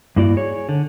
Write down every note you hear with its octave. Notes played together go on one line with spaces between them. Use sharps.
G2 A#3 E4 F#4 D5
G#4 C#5
D3